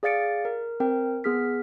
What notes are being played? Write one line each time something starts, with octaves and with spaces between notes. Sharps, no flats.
G#4 D5 F5 A6 C#7 D7
A#4
C4 A#4 G5
B3 G#4 F6 B6